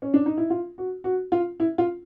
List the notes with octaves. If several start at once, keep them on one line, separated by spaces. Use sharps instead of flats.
C#4
D4
D#4
E4
F4
F#4
F#4
F4
E4
F4